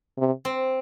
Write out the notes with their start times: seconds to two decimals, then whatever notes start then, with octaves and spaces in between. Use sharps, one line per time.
0.18 C3
0.45 C4